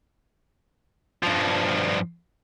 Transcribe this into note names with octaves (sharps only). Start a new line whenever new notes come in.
G2 F3